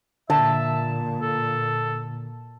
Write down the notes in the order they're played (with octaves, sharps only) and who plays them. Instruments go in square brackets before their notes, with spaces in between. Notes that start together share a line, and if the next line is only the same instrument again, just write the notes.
[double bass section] A#2 [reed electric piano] D3 [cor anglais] E5 [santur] A5
[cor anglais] A4